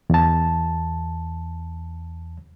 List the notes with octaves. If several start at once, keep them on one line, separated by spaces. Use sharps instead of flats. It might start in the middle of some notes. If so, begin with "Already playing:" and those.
E2 A5